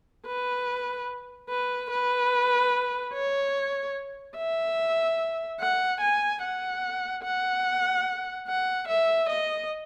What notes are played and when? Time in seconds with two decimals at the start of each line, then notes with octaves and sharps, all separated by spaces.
0.27 B4
1.50 B4
1.90 B4
3.13 C#5
4.37 E5
5.60 F#5
6.01 G#5
6.42 F#5
7.23 F#5
8.47 F#5
8.88 E5
9.29 D#5